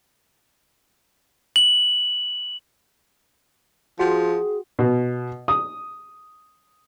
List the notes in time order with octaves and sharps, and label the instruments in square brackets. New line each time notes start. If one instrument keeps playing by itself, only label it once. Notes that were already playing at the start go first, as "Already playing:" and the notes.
[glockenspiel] F#7
[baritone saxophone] F3 [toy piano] F#4 F#5 G5 [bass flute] G#4
[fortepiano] B2
D#6